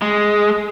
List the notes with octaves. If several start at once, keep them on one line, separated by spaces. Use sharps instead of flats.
G#3